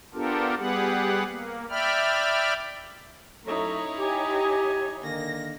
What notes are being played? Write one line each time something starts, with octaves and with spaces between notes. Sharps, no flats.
B3 D4 F4 G4 A4 A#4
G3 B3 G4 G#4 B4 F#5
A#3
D5 E5 G5 B5 F6
F#2 A3 D#4 E4 C#5 A#5
G4 G#5
D3 D#3 A#3 A#6